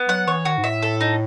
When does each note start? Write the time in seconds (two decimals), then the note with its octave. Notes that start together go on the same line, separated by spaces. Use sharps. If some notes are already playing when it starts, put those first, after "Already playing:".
Already playing: B3
0.08 F#3 F#5
0.27 E3 C#5
0.45 D#3 F#4
0.58 G#2
0.64 A2 E5
0.83 A4
1.01 D#4